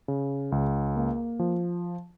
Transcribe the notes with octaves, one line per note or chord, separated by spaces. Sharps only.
C#3
C#2
A#3
F3